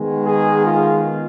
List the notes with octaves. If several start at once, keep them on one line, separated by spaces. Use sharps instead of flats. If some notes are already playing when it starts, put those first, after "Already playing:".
Already playing: D#3 G#3 B3
G#4
F4